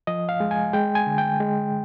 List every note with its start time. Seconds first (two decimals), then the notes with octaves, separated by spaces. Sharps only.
0.07 F3 D#5
0.29 F5
0.40 G#3
0.51 G#5
0.73 G#3 G5
0.95 G#5
1.07 D3
1.18 G5
1.40 G#3